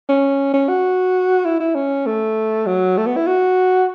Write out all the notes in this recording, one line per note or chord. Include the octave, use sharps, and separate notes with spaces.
C#4
C#4
F#4
E4
E4
C#4
A3
F#3
A3
B3
E4
F#4